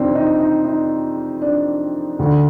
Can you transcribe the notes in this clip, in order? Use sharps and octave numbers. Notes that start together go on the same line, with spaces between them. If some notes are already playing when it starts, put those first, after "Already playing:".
Already playing: F2 C3 D#3 C4 D4
D#4
D#4
D#4
D4
D2 D3